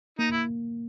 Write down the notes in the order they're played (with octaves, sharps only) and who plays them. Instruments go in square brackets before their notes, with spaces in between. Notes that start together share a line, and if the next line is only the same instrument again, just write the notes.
[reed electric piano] A#3 [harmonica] D#4
[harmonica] E4